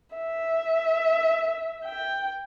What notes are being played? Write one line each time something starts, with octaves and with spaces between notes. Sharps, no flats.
E5
G5